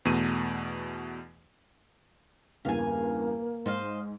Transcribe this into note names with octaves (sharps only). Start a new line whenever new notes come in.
E2 B2 A3 D#7
E2 G2 C#3 A#3 F5 G#5
G#2 C5 D#5 F5